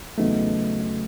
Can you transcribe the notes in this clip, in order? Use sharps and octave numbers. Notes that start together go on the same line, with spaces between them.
E2 C#3 F#3 A3 B3 D#4